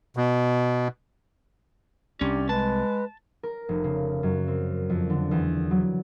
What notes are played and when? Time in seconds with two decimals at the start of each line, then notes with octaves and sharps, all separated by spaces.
0.17 B2
2.21 C2 C#4 D4 G4 D5
2.49 G#3 B4 A5
3.43 A#4
3.69 F1
3.84 C#3
4.23 F#2
4.47 C4
4.90 F2
5.09 D3
5.31 E2
5.71 F#3